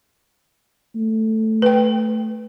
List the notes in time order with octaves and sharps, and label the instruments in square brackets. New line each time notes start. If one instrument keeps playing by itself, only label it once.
[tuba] A3
[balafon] B4 G5